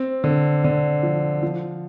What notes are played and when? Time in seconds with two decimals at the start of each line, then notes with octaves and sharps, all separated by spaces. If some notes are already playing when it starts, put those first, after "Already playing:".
Already playing: C4
0.24 D3
0.64 D3
1.03 F3
1.43 F3